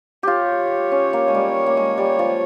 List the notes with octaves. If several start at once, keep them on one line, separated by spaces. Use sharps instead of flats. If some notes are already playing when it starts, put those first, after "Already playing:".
F4 G4 C#5
C#4
A#3
G#3
G3
A#3
G#3
G3
F3